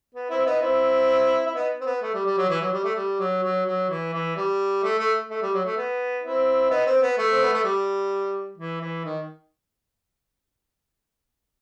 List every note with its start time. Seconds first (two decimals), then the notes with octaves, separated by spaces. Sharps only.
0.15 B3
0.30 C4 E4
0.46 B3 D#4
0.62 C4 E4
1.47 E4
1.55 B3 D#4
1.81 C4
1.86 B3
2.02 A3
2.14 G3
2.26 G3
2.37 F#3
2.49 E3
2.61 F#3
2.73 G3
2.84 A3
2.96 G3
3.20 F#3
3.43 F#3
3.66 F#3
3.89 E3
4.13 E3
4.36 G3
4.83 A3
4.98 A3
5.30 A3
5.42 G3
5.54 F#3
5.65 A3
5.77 B3
6.24 C4 E4
6.70 B3 D#4
6.86 C4
7.02 B3
7.18 A3
7.32 C4
7.42 B3
7.53 A3
7.64 G3
8.58 E3
8.81 E3
9.05 D#3